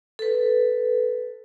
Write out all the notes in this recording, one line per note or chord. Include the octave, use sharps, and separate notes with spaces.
A4 B4